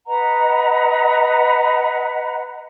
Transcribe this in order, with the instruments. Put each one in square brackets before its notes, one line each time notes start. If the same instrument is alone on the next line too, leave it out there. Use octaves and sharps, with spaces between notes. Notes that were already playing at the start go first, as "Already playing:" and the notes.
[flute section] B4 D#5 F#5 A#5